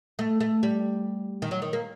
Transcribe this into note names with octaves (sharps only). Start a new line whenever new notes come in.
A3
A3
G3
D#3
F#3
D#3
A#3